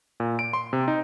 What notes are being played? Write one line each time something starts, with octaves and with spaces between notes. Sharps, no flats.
A#2
D7
C6
C3
D#4